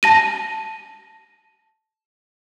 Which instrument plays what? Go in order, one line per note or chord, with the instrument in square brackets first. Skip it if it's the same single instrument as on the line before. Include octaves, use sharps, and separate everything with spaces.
[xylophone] A5 A#6 D#7